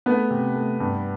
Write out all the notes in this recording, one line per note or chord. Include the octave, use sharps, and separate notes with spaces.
A3 B3 B4
C3
A3
G2